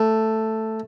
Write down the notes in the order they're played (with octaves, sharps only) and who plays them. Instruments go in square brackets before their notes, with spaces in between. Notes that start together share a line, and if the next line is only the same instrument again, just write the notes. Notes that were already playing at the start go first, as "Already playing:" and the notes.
Already playing: [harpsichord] A3